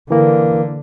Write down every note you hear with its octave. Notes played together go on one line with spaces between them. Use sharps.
D3 E3 A#3